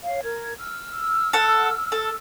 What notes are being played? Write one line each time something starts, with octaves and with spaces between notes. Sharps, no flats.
C#5 F5
A#4 G#6
E6 F6
A4 F#5
A4